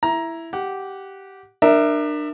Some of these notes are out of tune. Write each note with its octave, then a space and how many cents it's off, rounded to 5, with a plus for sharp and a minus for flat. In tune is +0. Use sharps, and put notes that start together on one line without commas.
E4 +5 A#5 +15
G4 -10 F#5 +5
D4 +30 A#4 +0 E5 +0